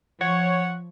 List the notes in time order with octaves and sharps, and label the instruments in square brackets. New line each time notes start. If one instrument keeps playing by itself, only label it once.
[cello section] F3 [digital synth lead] C#5 [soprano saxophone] F#5